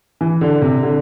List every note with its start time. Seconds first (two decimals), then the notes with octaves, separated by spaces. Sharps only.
0.21 E3
0.41 D3
0.62 C3
0.83 D3